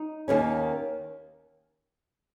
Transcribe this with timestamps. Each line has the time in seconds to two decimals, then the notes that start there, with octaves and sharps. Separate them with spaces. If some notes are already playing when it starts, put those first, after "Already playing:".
Already playing: D#4
0.28 D#2 D#3 A#3 C#4